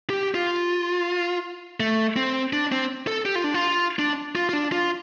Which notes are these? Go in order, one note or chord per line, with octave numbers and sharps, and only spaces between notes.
G4
F4
A3
C4
D4
C4
A4
G4
F4
D4
F4
D4
F4
F4
D4
F4